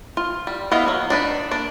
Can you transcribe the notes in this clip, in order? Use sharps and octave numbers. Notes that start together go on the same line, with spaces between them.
F4
G3
B3 E4 D#5 F5
F#3 A#3
D4 D#4 B4
A#3 D4